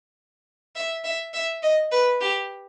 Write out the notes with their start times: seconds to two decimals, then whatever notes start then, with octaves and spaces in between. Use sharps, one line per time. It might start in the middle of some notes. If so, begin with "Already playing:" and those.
0.75 E5
1.04 E5
1.33 E5
1.62 D#5
1.91 B4
2.20 G4